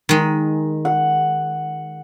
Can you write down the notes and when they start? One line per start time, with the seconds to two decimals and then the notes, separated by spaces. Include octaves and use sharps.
0.09 D#3 G#3
0.85 F#5